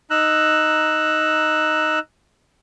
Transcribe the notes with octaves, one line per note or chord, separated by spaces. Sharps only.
D#4 A#5 E6 F#6